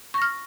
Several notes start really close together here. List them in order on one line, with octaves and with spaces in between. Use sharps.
C#6 A#6 F6